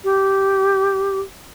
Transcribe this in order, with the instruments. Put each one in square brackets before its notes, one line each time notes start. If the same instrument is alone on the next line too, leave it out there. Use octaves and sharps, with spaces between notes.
[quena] G4